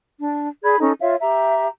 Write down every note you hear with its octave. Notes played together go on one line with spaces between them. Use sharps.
D4
G#4 D5 B5 G#6
C#4 D#4 A4
F4 C#5 E5 F5
G4 E5 A#5